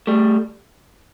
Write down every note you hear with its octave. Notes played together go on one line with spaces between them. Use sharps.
G3 A3